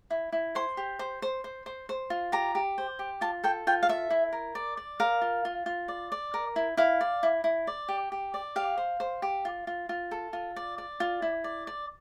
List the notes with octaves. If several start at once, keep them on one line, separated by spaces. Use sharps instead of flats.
E4
E4
C5 C6
G4
C5
C5
C5
C5
C5
F4
G4 A#5
G4
C5
G4
F4 A5
A4 G5
F4 G5
F5
A4 E5
E4
A#4
D5
D5
A#4 F5
F4
F4
F4
D5
D5
A#4
E4
E4 F5
D5
E4
E4
D5
G4
G4
D5
G4 F5
C5
C5
G4
F4
F4
F4
A4
F4
D5
D5
F4
E4
D5
D5